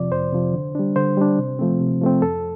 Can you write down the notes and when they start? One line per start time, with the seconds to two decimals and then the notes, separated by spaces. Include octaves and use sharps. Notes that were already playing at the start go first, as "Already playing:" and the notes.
Already playing: F2 C3 F3 D5
0.12 F2 C5
0.32 C3 F3
0.54 D3
0.75 G3 D4
0.96 D3 C5
1.17 G3 D4
1.38 C3
1.59 F3 A3 C4
1.80 C3
2.01 F3 A3 C4
2.22 F2 A4